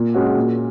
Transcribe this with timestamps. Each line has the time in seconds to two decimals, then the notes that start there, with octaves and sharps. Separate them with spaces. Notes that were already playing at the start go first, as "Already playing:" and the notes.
Already playing: A#2
0.14 G#3 C#4 F#4
0.36 A#2